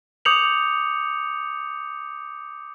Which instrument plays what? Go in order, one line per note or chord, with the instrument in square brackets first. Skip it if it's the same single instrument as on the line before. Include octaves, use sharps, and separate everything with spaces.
[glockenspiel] D6 D#6 G6 C#7 F7 F#7